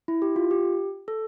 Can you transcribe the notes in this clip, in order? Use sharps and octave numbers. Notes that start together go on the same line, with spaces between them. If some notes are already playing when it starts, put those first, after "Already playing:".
E4
G4
F4
G4
A4